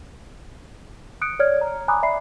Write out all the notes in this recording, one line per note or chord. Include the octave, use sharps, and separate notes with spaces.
D#6 F#6 C#7 D7
C#5 D5 F6 G#6
A#5
G#5 A#5 B5 D6 D#6 F#6
D5 E5 B5 C7